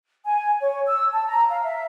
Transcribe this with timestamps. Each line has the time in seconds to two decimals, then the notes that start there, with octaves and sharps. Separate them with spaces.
0.24 G#5
0.61 C#5
0.86 E6
1.13 A5
1.26 A#5
1.49 F5
1.63 E5